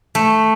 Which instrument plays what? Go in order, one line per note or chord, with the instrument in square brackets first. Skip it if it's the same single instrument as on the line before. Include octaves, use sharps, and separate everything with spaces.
[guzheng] A3